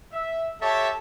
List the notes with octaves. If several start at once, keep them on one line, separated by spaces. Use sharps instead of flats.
E5
G4 A4 C#5 E5 A5